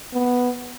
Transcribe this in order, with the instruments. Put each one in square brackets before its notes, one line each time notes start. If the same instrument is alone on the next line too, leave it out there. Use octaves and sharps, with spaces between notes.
[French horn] B3